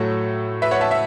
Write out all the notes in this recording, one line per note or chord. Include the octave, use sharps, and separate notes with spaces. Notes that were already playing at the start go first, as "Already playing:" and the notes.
Already playing: A2 F#3 A4 C#5
B4 E5
C#5 F#5
E5 A5
E5